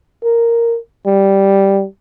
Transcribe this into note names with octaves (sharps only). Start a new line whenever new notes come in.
A#4
G3